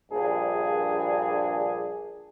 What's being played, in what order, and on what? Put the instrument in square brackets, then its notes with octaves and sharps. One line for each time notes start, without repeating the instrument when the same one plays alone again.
[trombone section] A#1 G2 D4 G#4